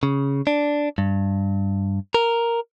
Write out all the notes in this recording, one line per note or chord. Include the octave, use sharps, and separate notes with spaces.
C#3
D4
G2
A#4